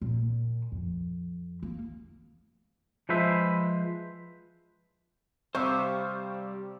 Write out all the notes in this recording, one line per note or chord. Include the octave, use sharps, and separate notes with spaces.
A#2
F2
A#3
F3 G#3 B4 C5 E5
C3 G3 C5 F5 C#6 E6